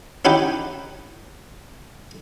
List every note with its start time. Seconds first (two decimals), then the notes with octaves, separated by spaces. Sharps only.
0.25 C#4 D#4 E4 F#4 G4